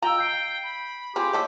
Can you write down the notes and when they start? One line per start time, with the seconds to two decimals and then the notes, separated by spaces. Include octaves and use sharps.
0.02 F4 D#5 F5 G5 A#5 E6
0.18 G6 C7 D7
0.63 B5
1.16 C4 F4 G4 G#4
1.33 F3 A4 C5 C#5 D#5 B6